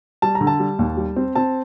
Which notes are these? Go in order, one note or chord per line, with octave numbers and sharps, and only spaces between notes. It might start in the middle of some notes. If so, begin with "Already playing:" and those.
G3 A5
A#5
D3
A5
G3
D#2
G3
C4
C4 A5